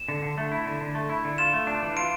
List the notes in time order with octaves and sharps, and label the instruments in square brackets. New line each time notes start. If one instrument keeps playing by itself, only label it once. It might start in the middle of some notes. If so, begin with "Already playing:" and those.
Already playing: [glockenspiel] E7
[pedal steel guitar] D3
D3
A3
E4
D3
D3
A3
E4
D3
[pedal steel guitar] F4 [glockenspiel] E7
[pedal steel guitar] A3
D4
E3
[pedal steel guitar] F4 [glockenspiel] D7